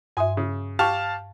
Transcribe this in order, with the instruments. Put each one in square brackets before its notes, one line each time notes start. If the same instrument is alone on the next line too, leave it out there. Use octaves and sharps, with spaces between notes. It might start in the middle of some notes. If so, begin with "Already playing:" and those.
[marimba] G2 E5 [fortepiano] G#5 C6 D#6
[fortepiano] C#3
[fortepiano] G4 C#6 [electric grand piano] F5 A5 F6